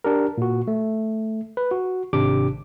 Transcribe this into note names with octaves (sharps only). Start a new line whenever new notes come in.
D4 G4 A#4
A#2 F#4
A3
B4
F#4
G#1 C3 D4 G4 D6